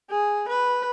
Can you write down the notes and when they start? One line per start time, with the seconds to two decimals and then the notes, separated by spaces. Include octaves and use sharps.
0.10 G#4
0.48 B4